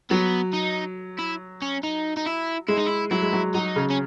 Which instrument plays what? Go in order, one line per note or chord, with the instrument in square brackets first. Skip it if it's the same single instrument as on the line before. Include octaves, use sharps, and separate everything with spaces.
[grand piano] F#3 [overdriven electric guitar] B3
[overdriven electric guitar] D#4
E4
C#4
D#4
D#4
E4
[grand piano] G#3 [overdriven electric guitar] E4
[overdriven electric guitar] D#4
E4
[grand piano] F#3 [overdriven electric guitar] E4
[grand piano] G#3
F#3
[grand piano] F#3 [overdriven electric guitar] D#4
[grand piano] C#3
[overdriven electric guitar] C#4